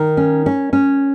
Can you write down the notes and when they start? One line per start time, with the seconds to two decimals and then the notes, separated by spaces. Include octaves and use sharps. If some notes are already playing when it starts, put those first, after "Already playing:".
Already playing: D#3 A#4
0.17 C#4
0.46 C#4
0.73 C#4